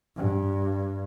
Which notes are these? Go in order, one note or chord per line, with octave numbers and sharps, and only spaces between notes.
G2